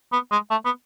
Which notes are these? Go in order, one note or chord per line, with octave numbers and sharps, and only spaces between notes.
B3
G#3
A3
B3